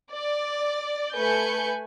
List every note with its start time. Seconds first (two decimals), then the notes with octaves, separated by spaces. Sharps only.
0.10 D5
1.15 A3 B4 G#5 G6 C#7